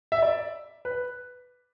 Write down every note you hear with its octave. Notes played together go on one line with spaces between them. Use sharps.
E5
D5
B4